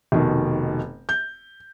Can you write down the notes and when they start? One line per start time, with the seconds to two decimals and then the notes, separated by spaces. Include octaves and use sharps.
0.12 F1 B2 D#3
1.09 G6